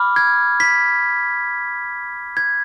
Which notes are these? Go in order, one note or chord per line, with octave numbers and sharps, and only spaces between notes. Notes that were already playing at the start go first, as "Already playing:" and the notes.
Already playing: B5 D6 F6
G#6
B6
G#6